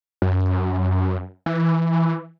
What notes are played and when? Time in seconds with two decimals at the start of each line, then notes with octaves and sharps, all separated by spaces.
0.22 F#2
1.46 E3